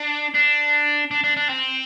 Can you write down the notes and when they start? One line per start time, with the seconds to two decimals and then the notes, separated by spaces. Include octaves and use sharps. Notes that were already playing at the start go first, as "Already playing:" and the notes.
Already playing: D4
0.34 D4
1.11 D4
1.24 D4
1.37 D4
1.49 C4